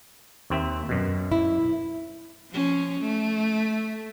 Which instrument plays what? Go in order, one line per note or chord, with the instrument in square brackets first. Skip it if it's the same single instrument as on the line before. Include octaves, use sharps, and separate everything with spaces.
[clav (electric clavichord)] D#2 C4 E5
F#2 B2
[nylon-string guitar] E4
[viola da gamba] F3 C#4
A3